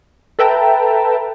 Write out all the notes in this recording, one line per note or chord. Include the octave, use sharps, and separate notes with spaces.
A4 B4 E5 G5 A5 A#5